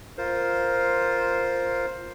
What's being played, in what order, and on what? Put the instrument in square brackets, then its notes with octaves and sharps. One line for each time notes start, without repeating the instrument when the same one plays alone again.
[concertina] F4 A#4 C5